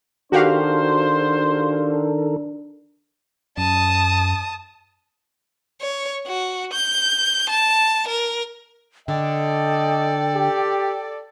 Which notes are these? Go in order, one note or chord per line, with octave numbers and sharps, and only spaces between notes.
D#3 D4 F#4 G4 A4 A#4 C5 F5
F#2 A5 D#6
C#5
F#4
G6
A5
A#4
D3 A4 D5 D#5 G5
G4